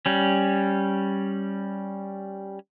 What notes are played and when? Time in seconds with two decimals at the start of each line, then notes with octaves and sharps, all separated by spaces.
0.06 G3 C#4